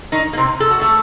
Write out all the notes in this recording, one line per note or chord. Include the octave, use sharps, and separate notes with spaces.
D#3 D#4
A#3
C3 C4
A4
F#4
A3 A4